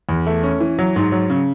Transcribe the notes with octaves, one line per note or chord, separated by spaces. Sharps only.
E2
A3
C#4
E3
F#3
G#2
F#3
C#3